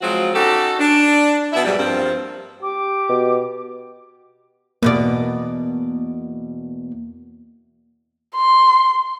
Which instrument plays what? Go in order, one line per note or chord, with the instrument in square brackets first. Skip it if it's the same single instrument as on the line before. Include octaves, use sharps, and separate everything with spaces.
[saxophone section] F3 F#3 G#3 C4 F4 F#4
C#4 D#4 F#4 G4 A4
D4
B2 B3 D4 E4
G#2 B2 F#3 G3
G2 F3 A#3 C4
[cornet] G4 [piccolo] D6
[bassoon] B2
[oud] E2 B2 D5 [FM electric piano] A#3
[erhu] C6